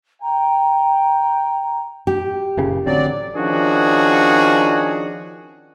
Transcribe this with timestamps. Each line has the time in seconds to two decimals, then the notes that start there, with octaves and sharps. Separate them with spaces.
0.22 G5 A#5
2.07 G4
2.57 F#1 A#2 C#3
2.86 A1 D3 F#3 C4 D5
3.36 D#3 F3 C#4 D4 F#4 G#4